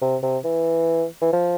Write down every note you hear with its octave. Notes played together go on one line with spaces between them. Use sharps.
C3
C3
E3
E3
F3